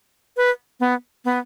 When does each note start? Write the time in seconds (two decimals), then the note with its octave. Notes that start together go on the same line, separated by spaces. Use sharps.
0.37 B4
0.80 B3
1.25 B3